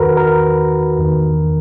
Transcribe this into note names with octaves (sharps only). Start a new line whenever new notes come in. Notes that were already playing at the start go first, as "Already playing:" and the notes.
Already playing: E2 D#3 F#4 A#4 B4
A#4
E2 D#3